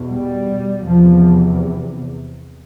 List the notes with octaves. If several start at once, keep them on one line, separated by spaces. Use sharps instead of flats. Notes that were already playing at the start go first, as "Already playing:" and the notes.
Already playing: E2 B2
G3
E2 C3 F3